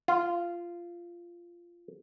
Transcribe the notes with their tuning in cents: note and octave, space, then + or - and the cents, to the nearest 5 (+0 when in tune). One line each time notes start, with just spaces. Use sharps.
F4 -15